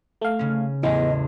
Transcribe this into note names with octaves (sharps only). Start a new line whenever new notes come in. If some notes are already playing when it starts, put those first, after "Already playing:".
A3 F5
C#3 C#4
A1 E2 E3 B3 D#5